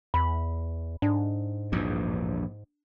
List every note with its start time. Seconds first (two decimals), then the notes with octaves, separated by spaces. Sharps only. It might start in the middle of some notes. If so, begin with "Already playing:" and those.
0.14 E2 B5
1.02 G#2 D4
1.72 A#1 E2 G2